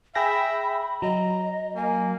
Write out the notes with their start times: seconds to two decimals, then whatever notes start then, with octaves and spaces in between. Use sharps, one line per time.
0.15 G#4 E5 G5 B5 A#6
1.02 F#3 D#5 A#5
1.76 A#3 G#5